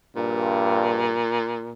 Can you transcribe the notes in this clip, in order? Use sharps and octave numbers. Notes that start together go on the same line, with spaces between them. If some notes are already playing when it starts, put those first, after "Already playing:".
A#1 G2 A#2